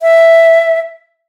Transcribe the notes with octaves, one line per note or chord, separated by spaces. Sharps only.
E5